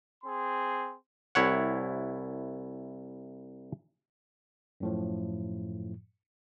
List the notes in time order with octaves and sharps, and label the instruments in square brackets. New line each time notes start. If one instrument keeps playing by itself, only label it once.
[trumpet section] C4 G#4 C6
[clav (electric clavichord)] C2 E4 C#5 F#5
[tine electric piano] F#2 A2 F3